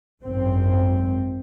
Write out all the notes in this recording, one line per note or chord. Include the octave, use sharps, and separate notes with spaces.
G#1 F#2 C4